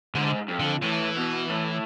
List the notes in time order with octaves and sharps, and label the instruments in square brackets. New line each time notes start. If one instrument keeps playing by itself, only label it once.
[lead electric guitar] G#2 [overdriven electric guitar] D3
[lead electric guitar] F2
[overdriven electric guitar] D3
[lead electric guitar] A2 [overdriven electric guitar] E3
[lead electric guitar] B2
A2